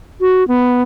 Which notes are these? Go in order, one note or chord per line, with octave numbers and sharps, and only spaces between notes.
F#4
B3